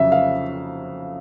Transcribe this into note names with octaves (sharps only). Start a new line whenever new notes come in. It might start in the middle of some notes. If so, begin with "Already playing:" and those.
Already playing: F2 C#3 F#3 E5
F5